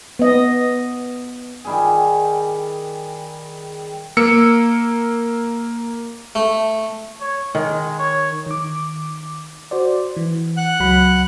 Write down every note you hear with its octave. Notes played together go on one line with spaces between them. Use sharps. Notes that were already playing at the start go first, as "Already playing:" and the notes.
B3 D#5
D#3 G3 G#4
A#3 E6 C#7
A3
C#5
D#3 G#3
C#5
D#3 D6
F#4 C5 D5
E3
F#5 F#6
C#2 F#3 B5